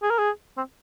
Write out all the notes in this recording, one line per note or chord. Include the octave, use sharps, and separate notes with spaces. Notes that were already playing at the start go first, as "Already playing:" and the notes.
G#4
A#4
G#4
C4